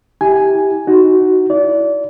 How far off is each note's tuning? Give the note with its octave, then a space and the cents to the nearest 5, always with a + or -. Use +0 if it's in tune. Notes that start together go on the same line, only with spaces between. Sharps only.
E4 -30 G4 +0 G#5 +0
D#4 +5 F#4 +10
E4 +0 D5 -25